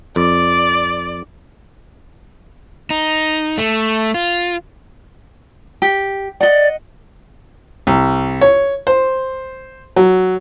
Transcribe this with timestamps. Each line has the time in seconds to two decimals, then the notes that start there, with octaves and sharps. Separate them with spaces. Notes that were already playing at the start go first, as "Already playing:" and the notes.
0.16 F2 D5
2.90 D#4
3.58 A3
4.14 F4
5.82 G4
6.41 D5 D#5 F#5
7.87 C2
8.41 C#5
8.87 C5
9.96 F#3